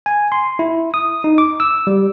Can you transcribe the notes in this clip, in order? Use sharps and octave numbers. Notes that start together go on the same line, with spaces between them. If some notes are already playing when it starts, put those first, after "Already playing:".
G#5
C6
E4
D#6
D#4
D6
E6
G3